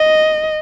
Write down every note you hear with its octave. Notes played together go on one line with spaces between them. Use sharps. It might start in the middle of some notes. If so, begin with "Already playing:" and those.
Already playing: D#5